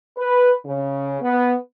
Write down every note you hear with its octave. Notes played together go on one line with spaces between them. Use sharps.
B4
C#3
B3